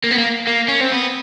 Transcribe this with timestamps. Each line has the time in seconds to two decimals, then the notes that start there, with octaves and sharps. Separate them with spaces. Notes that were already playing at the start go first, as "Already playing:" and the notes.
0.04 A#3
0.11 B3
0.18 A#3
0.47 A#3
0.68 C#4
0.81 C4
0.92 B3